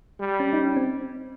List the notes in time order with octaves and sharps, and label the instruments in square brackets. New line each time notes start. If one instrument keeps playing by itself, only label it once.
[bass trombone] G3
[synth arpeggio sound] C#4
D#4
C#4
C4